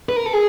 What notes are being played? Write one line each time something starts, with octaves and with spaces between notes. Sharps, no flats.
B4
A#4
A4
G#4